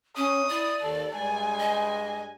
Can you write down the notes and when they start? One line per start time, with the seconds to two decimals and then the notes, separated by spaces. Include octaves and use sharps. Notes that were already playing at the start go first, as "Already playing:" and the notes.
0.17 C#4 C#5 D#6
0.49 E4 D5
0.82 D#2 A4
1.15 G2 G3 G#3 G#5
1.60 D#5